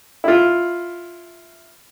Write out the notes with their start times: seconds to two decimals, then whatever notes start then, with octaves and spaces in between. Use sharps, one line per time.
0.24 E4 F4